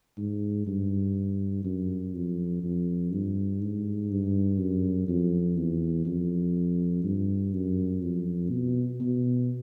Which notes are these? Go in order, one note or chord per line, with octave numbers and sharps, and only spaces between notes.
G#2
G2
F#2
F2
F2
G2
G#2
G2
F#2
F2
E2
F2
G2
F#2
F2
B2
B2